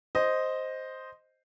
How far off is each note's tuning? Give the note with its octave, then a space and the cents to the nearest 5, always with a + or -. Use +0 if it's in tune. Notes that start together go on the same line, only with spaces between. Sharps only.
C5 +0 D#5 +0